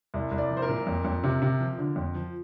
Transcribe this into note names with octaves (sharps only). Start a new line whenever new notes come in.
C2
C2
D5
F3
C5
A#4
A#2
F2
F2
C3
C3
F3
D3
F2
F3